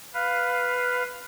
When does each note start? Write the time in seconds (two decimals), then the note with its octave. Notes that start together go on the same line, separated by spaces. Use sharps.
0.14 B4 F5